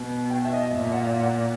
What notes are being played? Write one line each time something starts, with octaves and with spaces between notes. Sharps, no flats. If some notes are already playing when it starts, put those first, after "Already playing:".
Already playing: B2
G5
E5
D#5
A#2 E5
F#5
F5
F#5